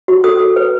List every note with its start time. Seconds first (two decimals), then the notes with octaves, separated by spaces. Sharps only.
0.08 F#4
0.24 A4 D#6
0.40 A4
0.56 B4